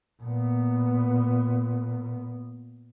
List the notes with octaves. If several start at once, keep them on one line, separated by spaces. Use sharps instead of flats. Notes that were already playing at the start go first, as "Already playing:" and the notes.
A#2 B3